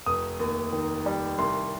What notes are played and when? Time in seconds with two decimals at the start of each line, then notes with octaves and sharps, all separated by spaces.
0.06 F1 D#6
0.40 D#2
0.73 D#3
1.06 G3
1.38 C2 C6